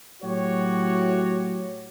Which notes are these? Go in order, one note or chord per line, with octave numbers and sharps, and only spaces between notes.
A2 F#3 F#4 G4 C#5